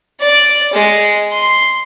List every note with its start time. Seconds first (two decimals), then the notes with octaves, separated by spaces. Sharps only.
0.21 D5
0.73 G#3
1.32 C6